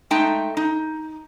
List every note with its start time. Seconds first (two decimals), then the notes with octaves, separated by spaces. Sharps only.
0.11 G#3 A3 D#4 G5 A5
0.57 D#4